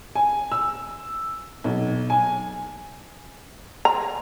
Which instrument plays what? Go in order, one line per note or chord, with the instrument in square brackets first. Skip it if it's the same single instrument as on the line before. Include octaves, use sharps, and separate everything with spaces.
[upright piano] G#5
E6
B1
G#5
[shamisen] A#5